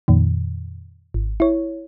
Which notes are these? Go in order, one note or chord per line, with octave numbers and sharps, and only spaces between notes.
F2 A#2 D#3
G#1
E4 C#5